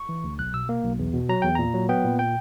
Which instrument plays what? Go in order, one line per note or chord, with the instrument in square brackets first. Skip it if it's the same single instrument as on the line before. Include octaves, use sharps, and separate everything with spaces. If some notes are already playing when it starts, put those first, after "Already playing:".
Already playing: [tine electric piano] C#6
E3
D2
B1 F#6
B2 E6
A#3
B1
E2
B2
F#3 A#5
E2 G5
A#2 A#5
F#3
B3 G5
A#2
G5